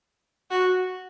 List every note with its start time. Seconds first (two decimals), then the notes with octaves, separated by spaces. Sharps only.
0.51 F#4